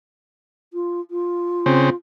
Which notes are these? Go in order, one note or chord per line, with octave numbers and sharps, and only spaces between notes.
F4
F4
C#3 C4